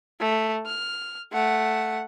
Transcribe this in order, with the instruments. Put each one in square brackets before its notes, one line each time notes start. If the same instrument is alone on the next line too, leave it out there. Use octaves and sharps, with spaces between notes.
[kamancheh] A3
F6
A3 F#5